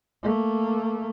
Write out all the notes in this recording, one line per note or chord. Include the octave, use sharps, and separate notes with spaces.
A3 A#3